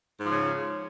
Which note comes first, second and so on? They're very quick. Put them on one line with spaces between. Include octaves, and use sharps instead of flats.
G#2 F3 C#3